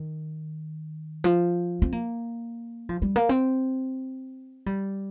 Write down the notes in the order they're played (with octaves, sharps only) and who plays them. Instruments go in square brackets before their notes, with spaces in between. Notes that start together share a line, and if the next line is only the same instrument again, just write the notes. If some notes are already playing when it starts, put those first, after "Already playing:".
Already playing: [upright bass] D#3
F3
C4
A#3
F3
G3
A#3
C4
G3